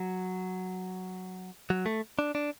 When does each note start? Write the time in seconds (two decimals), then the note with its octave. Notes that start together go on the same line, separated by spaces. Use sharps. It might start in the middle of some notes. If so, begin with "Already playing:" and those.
Already playing: F#3
1.70 F#3
1.86 A3
2.19 D4
2.35 D4